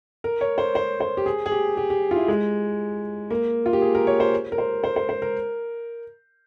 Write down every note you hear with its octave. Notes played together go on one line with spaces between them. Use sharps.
A#4
C#5
C5
C5
C5
G4
G#4
G#4
G4
G4
G4
F4
E4
G#3
A#3
F4
G4
G#4
A#4
C#5
C5
A#4
C5
C5
C5
C5
A#4